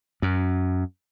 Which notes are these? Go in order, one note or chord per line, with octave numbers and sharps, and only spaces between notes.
F#2